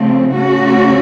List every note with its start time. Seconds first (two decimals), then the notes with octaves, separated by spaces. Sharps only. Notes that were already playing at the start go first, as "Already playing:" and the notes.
Already playing: C#3 F3 A3 C4
0.33 C#3 A3 C#4 F#4